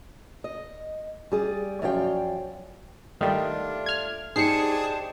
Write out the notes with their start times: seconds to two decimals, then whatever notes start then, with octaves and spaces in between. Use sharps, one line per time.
0.44 D#5
1.32 G3 G#4 D5
1.82 F#2 F3 C#5 D5 F5 G5
3.21 D#3 G3 A3 D4 F4
3.86 F6 G#6
4.36 D4 D#4 G4 G#4 C5 A5 C7 C#7